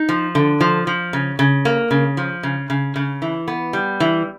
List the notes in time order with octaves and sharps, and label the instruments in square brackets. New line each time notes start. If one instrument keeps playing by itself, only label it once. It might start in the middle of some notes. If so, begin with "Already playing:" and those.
Already playing: [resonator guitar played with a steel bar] D#4
F3
D3
F3
F3
C#3
C#3
A#3
C#3
F3
C#3
C#3
C#3
E3
B3
G3
E3